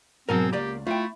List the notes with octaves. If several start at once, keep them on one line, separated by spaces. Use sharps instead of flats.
G#2 B2 F#3 C4 A#4 G#5 A5
C#2 A#3 G4 D5 A#5
A3 E4 F4 G5